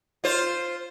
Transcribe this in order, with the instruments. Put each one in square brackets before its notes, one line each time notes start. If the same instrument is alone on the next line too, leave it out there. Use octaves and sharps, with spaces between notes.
[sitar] F4 C5